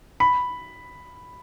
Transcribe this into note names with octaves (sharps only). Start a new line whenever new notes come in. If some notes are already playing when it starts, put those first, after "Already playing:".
B5